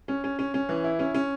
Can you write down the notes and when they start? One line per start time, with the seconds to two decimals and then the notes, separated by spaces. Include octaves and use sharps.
0.08 C#4
0.24 C#4
0.39 C#4
0.54 C#4
0.69 E3
0.84 E4
0.99 C#4
1.14 C#4